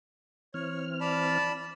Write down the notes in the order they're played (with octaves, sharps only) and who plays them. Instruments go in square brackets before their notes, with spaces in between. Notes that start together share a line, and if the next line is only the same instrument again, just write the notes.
[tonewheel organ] E3 C4 F6 [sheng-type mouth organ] C#5
[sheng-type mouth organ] D5 A5 B5